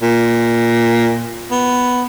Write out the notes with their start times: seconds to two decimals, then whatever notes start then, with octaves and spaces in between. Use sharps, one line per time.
0.02 A#2
1.51 B3